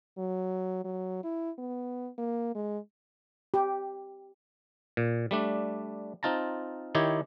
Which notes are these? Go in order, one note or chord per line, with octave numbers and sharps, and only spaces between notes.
F#3
F#3
E4
B3
A#3
G#3
G4
A#2
G3 A3 D4
C4 D#4 F4 A5 A#5
D#3 D#4 E4 G4 C#5